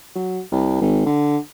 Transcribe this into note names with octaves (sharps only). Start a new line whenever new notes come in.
F#3
C2
G#1
D3